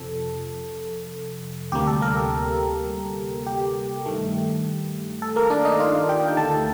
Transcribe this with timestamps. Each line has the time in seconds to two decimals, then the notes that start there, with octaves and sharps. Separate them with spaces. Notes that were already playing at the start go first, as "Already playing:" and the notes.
Already playing: F2 C3 F3 A4
1.72 D2 C3 G3 A#3 G4
1.87 A4
2.01 A#3 A#4
2.16 A4
3.46 G4
4.06 G2 D#3 A3
5.22 A4
5.36 A#3 A#4
5.50 D4 D5
5.65 D#4 D#5
5.79 F4 F5
6.09 G4 G5
6.28 G5
6.37 D2 D3 A3 A4 A5